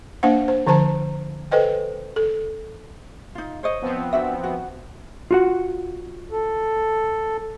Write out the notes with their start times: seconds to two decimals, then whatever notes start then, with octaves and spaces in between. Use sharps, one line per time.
0.23 A#3 D4 C5 F#5
0.48 C5
0.67 D3 F3 C5 A5 A#5
1.51 A4 B4 C5 D#5 G5
2.16 A4
3.35 D#4 F4
3.63 C5 C#5 D#5
3.81 F3 B3 C4
4.13 D4 F#4 E5
4.44 F#4
5.31 F4 F#4 F#5
6.31 A4